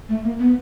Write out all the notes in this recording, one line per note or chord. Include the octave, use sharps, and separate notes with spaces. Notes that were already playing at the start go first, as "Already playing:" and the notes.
A3
A#3
B3